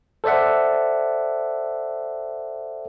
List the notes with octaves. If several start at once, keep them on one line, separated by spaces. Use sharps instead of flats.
A4 C5 D5 E5 F#5